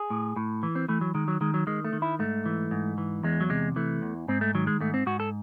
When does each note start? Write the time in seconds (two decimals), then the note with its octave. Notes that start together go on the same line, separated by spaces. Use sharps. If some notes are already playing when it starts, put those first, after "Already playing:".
Already playing: G#4
0.10 A2
0.36 A2
0.63 E3
0.75 C4
0.88 E3 A3
1.01 F#3
1.15 D#3 G#3
1.28 F#3
1.41 D#3 G#3
1.54 F#3
1.67 D#3 G#3
1.85 A3
1.93 D#3
2.02 E4
2.19 G#2 A3
2.46 E3
2.71 G#2
2.98 E3
3.23 E2 G#3
3.41 F#3
3.50 C3 G#3
3.76 E3 A3
4.02 E2
4.28 G#2 C4
4.41 A3
4.55 D#3 F#3
4.67 G#3
4.81 G#2 A3
4.94 C4
5.06 G#2 F#4
5.20 A4